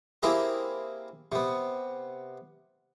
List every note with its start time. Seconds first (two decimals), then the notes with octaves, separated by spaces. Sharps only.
0.23 A#3 C4 E4 G4 G#4 A#4
1.32 C3 B3